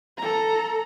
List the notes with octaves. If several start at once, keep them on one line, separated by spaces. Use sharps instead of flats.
A4 A#5